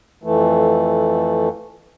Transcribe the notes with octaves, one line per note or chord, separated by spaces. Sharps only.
F2 E3 A3